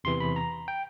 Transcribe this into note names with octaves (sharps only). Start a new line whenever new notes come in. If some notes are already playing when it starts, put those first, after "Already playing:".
E2 C3 E3 C6
B5
A#5
G5